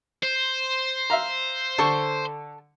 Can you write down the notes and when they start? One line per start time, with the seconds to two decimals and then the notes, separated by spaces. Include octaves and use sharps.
0.23 C5
1.10 E5 F5 A#5
1.78 D3 A4 C#6